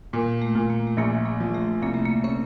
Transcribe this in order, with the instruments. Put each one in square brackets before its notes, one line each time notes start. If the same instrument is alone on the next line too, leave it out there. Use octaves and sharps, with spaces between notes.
[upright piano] A#2 [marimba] A#3
[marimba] A3
[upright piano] A#2
[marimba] A#3
A3
[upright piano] A#1 [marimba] A#3
[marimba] A#3
[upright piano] F3
[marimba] A3
[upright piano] C2 [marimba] A#3
[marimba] A3
A#3
[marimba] A#3 C#4 [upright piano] C4